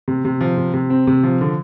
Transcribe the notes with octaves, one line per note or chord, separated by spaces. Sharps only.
C3
C3
F3
C3
C3
C4
C3
F3
D3